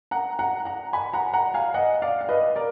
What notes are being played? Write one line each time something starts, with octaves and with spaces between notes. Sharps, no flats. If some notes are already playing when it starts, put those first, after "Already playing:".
F#5 A#5
F#5 A#5
F#5 A#5
G#5 B5
F#5 A#5
F#5 A#5
F5 G#5
D#5 F#5
D5 F5
F5
B4 D#5
A#4 D5